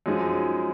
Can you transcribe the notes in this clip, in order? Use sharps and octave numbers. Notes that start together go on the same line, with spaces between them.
F#2 F3 G#3 D#4 G#4